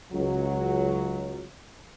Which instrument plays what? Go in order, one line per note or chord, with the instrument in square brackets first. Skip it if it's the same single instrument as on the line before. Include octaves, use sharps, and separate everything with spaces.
[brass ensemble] C#2 F#3